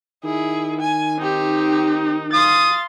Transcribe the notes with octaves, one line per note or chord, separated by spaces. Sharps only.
D#3 E4 G#4
G#5
C4 D#4 G4
F5 C6 D#6 A6